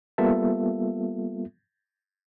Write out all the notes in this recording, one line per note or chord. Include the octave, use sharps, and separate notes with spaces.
G3 A#3 B3 F4 A4 E5